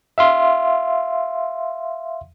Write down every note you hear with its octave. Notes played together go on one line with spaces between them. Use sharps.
E5 F5 C6